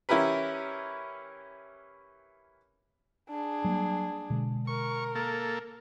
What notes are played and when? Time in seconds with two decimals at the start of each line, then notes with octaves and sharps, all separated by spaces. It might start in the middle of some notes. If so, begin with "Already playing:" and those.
0.09 E3 C#4 E4 G4 A#4 B4
3.30 D4 G#4
3.64 F#3 G3 A#3
4.30 B2 D3 G#3
4.67 A#4 C#6
5.15 A#3 A4